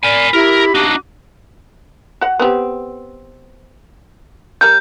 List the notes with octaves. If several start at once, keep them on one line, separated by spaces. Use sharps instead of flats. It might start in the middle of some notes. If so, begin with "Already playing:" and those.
A#4 D5 G#5 B5
E4 G4 A#4
D4 D#4 F#4 D6
F#4 F#5
B3 C4 G4
G3 A#4 G6